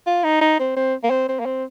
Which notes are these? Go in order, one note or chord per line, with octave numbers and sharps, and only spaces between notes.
F4
D#4
D#4
C4
C4
A#3
C4
C4
A#3
C4